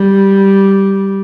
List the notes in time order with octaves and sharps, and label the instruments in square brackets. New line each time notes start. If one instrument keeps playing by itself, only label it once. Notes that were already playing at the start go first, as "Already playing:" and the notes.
Already playing: [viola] G3